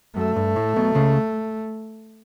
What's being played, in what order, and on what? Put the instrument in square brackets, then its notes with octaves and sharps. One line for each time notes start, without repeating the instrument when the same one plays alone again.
[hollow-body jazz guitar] F#2 [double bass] A3
[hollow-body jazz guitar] G2
A2
B1 B2
C#2 C#3